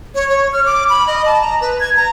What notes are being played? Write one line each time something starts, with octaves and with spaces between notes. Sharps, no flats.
C#5
C#5
F6
D6
B5
D#5
A5
A#5
B4
G#6
A#5